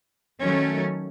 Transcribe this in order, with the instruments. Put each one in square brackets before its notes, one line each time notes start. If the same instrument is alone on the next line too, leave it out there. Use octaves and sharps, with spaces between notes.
[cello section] D#3 F#3 A3 C#4